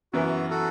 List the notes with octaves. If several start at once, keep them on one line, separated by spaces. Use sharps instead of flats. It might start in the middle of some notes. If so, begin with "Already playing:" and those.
F#2 E3 B3 E4 F#4
F#4 A4